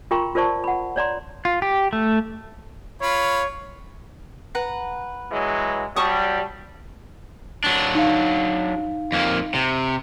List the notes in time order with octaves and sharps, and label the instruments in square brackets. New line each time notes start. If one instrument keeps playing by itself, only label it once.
[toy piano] F4 A#4 G5 A#5 C6 C#6
F4 A#4 C5 D5 A5 C#6
F#5 B5
C#5 D5 A#5 C6
[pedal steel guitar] F4
G4
A3
[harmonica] F4 B5 [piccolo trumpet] C#5
[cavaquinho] B4 F#5 A#5
[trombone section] E3 F#3 G#3
[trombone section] F#3 G3 [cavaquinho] A5 C#6 D#6
[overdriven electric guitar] F#3 D4
[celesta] D#4 F5
[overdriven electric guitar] F2 A#3
C3